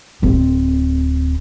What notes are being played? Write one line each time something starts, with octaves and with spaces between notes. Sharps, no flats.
D1 C4